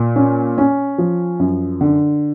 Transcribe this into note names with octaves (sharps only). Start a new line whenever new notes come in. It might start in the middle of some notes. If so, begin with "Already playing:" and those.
Already playing: A#2
C#4
C#4
F3
F#2
D3